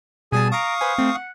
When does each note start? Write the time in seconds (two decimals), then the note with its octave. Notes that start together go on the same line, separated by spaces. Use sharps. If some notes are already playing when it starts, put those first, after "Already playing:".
0.32 B2 G3 G#4 G#5 A5
0.52 F5 A#5 C#6 D#6 D7
0.81 B4 C5 G#5
0.98 A3 C4
1.15 F#5